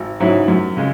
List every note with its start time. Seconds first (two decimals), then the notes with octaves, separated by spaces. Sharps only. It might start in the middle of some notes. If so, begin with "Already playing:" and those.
Already playing: G#1
0.20 G#2 F#3 C#4 E4
0.48 F#2
0.77 C#3 G#3